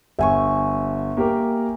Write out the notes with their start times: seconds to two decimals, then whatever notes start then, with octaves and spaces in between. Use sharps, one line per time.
0.19 G1 E5 G#5 C#6
1.17 A#3 G4 A#4